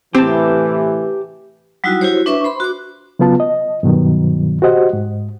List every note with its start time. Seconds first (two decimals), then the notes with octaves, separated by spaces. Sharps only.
0.15 A2 C3 E3 C4 G4 A5
1.84 F#3 G3 D#4 E4 F#4
2.01 E4 F#4 G4 C5 C#5
2.26 D4 B4 E5 C#6
2.44 C5 B5 C6
2.60 F#4 D6
3.19 C#3 F#3 B3 F4 A5
3.40 D#5
3.83 G2 B2 D#3 F#3
4.62 F#4 G4 C5 D#5 F#5
4.93 G#2